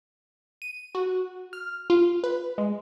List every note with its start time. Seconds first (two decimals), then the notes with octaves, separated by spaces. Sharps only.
0.62 D#7
0.95 F#4
1.53 F6
1.90 F4
2.24 B4
2.58 G#3